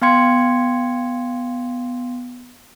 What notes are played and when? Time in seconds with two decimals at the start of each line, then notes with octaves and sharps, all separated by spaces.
0.02 B3 F5 G5 C6 G#6 C#7